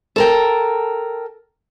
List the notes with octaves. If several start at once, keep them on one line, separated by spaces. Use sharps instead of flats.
A4 A#4 G5